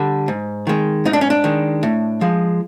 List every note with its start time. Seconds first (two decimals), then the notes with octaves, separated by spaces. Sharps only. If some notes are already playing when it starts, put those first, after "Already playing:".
Already playing: D3 G3
0.28 G#2
0.67 D#3 G#3
1.05 G#2 D#4
1.13 D4
1.21 C#4
1.30 D4
1.44 D#3 G#3
1.83 A2
2.21 F3 G#3